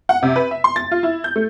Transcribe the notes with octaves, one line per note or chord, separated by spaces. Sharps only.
F#5
C3
B4
E5
C6
A6
F4
E4
G6
A3